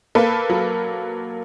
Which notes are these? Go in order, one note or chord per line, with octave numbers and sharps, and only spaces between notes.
A#3 A4 B4
F#3